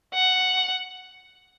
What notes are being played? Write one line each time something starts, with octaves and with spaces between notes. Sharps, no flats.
F#5